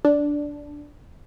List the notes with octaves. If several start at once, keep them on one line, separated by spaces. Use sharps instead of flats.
D4